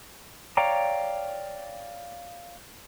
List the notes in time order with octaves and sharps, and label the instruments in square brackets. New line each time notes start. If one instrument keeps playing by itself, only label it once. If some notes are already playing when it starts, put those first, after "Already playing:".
[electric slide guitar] C#5 D5 F5 G5 A#5